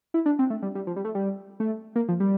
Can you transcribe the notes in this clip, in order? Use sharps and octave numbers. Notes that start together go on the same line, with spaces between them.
E4
D4
C4
A3
G3
G3
F3
G3
A3
G3
A3
A#3
F3
G3